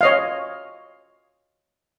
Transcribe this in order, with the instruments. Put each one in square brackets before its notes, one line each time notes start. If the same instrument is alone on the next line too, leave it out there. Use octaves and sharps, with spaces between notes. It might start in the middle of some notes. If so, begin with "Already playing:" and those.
[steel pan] C#5 D#5 F5